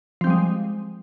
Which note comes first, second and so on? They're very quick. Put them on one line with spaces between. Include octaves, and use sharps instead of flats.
F3 C4 G3 G#3